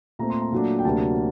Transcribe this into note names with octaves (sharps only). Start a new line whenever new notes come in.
A#2 A3 C4 A#5
C6
A#5
A#2 F#3 A3 D4
G5
D2 C3 F#3 A#3 D4 A5